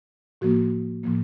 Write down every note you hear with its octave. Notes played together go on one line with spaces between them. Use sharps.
A2 F3 A#3 F#4
A2 F3 A#3